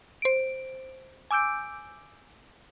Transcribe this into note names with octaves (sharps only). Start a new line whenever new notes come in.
C5 D7
G#5 D6 E6 G6 D7